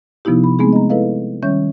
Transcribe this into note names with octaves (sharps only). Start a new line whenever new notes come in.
C3 F3 B3 D#4 E4 G4
B5
G#3 A3 B3 C4 D#4 G#4
D#5 A#5
E4 A4 B4 D#5 F5
D#3 G3 C#4 C#5 E5 G6